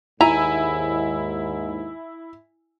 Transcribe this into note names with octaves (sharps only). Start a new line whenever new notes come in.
D#2 G#2 E4 G#5 A#5